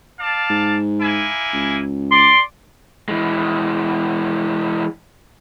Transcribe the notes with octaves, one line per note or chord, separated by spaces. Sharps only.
D5 F5 A5
G#2
A#3 E4 G#5
C#2
D5 C6
E3 G#3